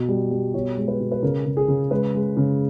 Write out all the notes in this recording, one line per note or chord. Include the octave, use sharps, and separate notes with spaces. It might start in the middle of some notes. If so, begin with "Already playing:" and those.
Already playing: B2
G3
G3
B2 C#5
G#3
B4
B2
B4
C#3 A#4
C#3
G#4
C#3
G#3 B4
G#3
C#3